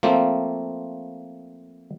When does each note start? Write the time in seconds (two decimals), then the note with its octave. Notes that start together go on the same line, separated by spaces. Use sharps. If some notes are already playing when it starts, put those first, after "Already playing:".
0.03 F3 A3 A#3 C4